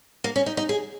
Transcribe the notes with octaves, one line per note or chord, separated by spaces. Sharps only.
A#3
C#4
D#4
D#4
G#4